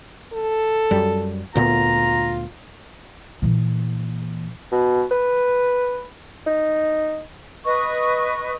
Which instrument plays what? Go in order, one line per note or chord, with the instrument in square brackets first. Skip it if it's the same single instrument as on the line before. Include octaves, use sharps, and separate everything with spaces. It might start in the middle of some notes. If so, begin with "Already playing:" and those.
[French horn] A4
[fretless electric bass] F#2 G3
[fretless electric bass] D2 A#2 B3 [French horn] F4 [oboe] A#5
[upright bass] A#2 E3
[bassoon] B2
B4
D#4
[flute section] B4 D#5 C#6 D#6